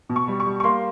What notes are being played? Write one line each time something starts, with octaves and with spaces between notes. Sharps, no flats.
B2
C#6
G3
C#6
G3
C#6
A#3 C6